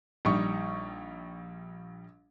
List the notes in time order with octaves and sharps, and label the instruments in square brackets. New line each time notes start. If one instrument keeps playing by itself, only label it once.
[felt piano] A#1 G3 D#4 C#6